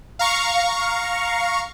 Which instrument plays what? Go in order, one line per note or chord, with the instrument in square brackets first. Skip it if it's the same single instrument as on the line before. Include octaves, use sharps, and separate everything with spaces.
[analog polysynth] F5 A#5 C#6